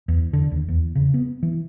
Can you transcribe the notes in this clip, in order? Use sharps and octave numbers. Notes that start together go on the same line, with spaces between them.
E2
D3
D#2
E2
C#3
B3
E3